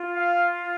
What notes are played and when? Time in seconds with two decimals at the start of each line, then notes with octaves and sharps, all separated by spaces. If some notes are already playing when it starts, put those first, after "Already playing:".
Already playing: F4
0.16 F5